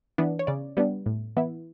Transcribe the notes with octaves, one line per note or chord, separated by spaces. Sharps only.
E3 B3 D4
C#5
C#3 D5
G3 B3 D4
A2
E3 B3 E4